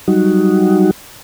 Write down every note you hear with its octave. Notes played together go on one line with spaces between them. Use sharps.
F#3 G3 D#4 F#4